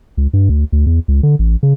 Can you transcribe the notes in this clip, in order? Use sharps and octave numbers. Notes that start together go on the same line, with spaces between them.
C#2
G2
D2
D2
E2
C#2
D3
A1
C#3